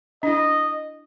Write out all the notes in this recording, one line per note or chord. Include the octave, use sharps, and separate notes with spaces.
D4 E4 D#5